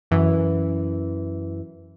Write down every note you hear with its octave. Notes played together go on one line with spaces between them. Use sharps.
F#2 E3